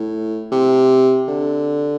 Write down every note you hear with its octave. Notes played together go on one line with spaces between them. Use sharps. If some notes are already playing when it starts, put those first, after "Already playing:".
Already playing: A2
C3
D3